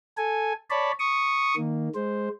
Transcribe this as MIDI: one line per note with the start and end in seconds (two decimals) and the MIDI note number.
0.17 0.53 69
0.17 0.53 80
0.70 0.92 73
0.70 0.92 74
0.70 0.92 81
0.70 0.92 83
1.00 1.55 85
1.00 1.55 87
1.56 1.89 51
1.56 1.89 58
1.95 2.29 56
1.95 2.29 72